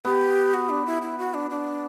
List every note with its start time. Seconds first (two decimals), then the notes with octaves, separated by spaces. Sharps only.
0.05 B3 G4
0.54 F#4
0.69 D4
0.86 E4
1.02 E4
1.18 F#4
1.34 D4
1.50 D4